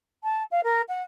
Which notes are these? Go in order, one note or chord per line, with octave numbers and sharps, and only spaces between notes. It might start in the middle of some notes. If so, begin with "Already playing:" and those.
A5
F5
A#4
F#5